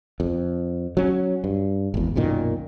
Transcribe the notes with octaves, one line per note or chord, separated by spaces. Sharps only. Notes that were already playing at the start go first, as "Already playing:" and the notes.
F2
F#3 C#4
G2
G#1 E2
B1 F#2 A#2 D#3